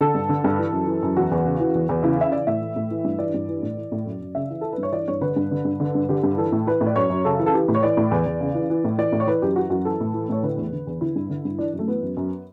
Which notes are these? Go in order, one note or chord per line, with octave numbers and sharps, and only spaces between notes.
D3 A4
G2
D3
G2
E3
F#2
E3
F#2
E2 F#4
E2
C#3
E3
E2
E2
C#3 E4
E3 E5
E3 D5
A2 E5
E3
A2
E3
G2
E3 D5
G2
E3
A2
E3
A2
F#2
F#2
C#3 E5
E3
E3 A4
B4
G2
C#5
E3 D5
G2 C#5
D3 B4
G2
D3
G2
D3
G2
D3 G4
G2
E3 A4
A2
E3 B4
A2
D5
F#2 C#5
F#2
C#3 A4
E3
A4
E3 G4
A2
C#5
E3 D5
A2
E2
E2
C#3
E3
E3
A2
E3 D5
A2
C#5
E3 B4
F#2 G4
E3 F#4
F#2 F#4
E3 A4
A2
E3
A2 C#5
D3 B4
E2
D3
E2
D3 E4
G2
D3
G2
E3 D4
F#2
A3
E3 B3
F#2
F#2